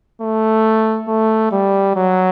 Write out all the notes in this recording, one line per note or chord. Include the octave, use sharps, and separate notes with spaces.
A3
A3
G3
F#3